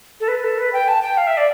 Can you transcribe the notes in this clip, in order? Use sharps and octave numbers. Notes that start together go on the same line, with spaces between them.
A4
B4
A4
B4
G5
A5
G5
F5
E5
D5